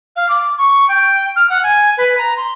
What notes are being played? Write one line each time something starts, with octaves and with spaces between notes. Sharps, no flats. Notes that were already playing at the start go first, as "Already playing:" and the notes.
F5
D6
C#6
G5
F6
F#5
G#5
B4
A#5
C6